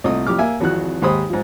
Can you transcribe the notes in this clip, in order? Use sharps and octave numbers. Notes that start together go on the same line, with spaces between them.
C2 A#2 A3 D#5 D#6
F2 A2 G4 D6 F6
A#3 E5 G#5
G#1 F2 E3 F#4 F#6
D#2 G#2 G4 C5 B5 D#6
G#2 F3